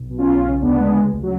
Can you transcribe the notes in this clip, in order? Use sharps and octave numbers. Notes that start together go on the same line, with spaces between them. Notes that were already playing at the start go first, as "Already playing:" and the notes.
Already playing: B1
B2
C#4 F4
B1
C#3 C#4 F4
D2 B3 D4
D2 G#3 B3
C#3 G#3
C#2
F#3